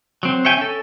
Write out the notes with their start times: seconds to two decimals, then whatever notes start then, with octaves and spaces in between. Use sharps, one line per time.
0.23 F#3 C4
0.45 C#5 E5 G5 G#5
0.57 C#4 A4